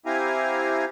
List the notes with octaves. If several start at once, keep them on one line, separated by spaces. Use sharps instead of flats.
C4 E4 G4 F5 G#5 A#5